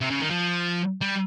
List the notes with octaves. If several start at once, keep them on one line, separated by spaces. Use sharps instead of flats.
C3
C#3
D#3
F3
G3